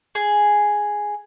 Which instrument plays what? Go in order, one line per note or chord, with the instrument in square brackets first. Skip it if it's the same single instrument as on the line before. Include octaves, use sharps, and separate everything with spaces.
[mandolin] G#4